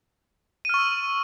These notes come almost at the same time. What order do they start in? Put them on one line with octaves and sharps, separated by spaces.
D#7 F6 C#6 E6